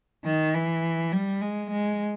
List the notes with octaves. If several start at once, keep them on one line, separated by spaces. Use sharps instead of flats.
D#3
E3
G3
G#3
G#3